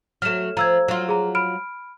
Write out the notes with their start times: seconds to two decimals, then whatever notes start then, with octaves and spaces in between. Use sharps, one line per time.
0.22 F#3 A3 F6 E7
0.57 F3 A#5 E6 G#6
0.88 F#3 F4
1.09 G#4 A#5
1.35 B5 F6 D7